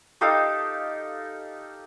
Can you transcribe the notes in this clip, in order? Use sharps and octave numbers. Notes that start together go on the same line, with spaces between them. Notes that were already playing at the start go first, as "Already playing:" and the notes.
D#4 G4 A4 F5